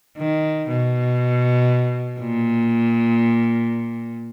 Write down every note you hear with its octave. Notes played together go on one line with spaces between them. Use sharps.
D#3
B2
A#2